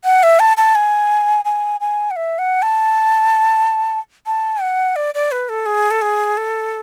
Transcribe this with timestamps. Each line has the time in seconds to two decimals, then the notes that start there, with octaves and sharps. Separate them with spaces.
0.05 F#5
0.23 E5
0.40 A5
0.57 A5
0.75 G#5
1.45 G#5
1.81 G#5
2.11 F#5
2.16 E5
2.39 F#5
2.62 A5
4.26 A5
4.61 F#5
4.96 D5
5.14 D5
5.32 B4
5.49 A4
5.66 G#4
5.91 A4
6.02 G#4
6.37 A4